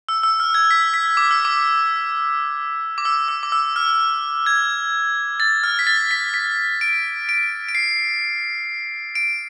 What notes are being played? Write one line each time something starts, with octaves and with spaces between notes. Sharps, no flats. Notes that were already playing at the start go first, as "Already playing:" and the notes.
E6
E6
F6
G#6
B6
B6
D6
E6
D6
D6
E6
E6
D6
E6
F6
G#6
A6
F6
B6
A6
B6
B6
D7
D7
D7
C7
D7